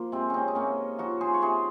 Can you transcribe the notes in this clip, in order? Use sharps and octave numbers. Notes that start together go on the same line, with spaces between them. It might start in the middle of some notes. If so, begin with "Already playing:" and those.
Already playing: F3 A#3
C3 G#3 C4
C4 C#4 D#4
D#4
C3 A#3 C#4
F3 D#4 F#4
G#4 C5
C#5
C3 G#4 C5